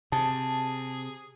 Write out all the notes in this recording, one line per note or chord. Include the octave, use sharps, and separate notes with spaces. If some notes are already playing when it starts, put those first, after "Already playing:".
C3 G#4 A5